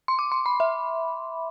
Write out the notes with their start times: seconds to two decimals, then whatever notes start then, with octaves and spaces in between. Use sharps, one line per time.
0.08 C6
0.19 D6
0.32 C6
0.46 B5
0.60 E5